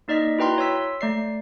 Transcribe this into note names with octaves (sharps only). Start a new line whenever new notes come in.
A#3 D#4 D5 D#5 B6
E4 F#4 B4 G5 A#5 C6
C#5 C6 E6 B6
A3 D5 C7